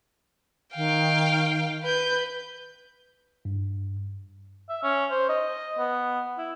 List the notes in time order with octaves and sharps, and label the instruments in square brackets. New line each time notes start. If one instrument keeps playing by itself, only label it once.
[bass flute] D#3 [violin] F5 G5
[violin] B4 G6
[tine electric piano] G2
[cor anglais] E5
C#4
C5
D#5
B3
E4